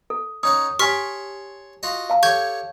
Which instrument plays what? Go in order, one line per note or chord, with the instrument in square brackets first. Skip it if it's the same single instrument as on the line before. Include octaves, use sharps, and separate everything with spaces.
[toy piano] A4
[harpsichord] C#4 D#4 F#5 [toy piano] D#6
[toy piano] G4 G#5 [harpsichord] C#5 A5 C6 [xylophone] C#6 F6 B6
[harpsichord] F4 F#4 D#5
[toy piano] F5 A5
[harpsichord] G4 A4 C#5 [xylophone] C#6 G6 G#6